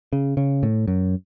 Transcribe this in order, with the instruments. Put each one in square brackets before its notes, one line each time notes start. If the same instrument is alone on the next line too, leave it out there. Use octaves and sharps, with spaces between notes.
[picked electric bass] C#3
C#3
A2
F#2